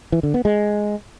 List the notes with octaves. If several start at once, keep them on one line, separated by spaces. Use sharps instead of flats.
E3
D3
B3
G#3